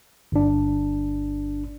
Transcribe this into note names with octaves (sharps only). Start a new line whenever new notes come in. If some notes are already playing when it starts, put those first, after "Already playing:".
G1 D4